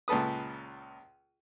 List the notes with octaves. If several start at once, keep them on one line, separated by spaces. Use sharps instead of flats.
C#2 A#2 A4 B4 D#6